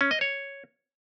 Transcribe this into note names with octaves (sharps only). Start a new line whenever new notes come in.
C#4
D#5
C#5